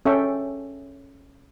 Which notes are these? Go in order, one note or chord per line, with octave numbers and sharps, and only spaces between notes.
C#4 A4 E5 G5 C#6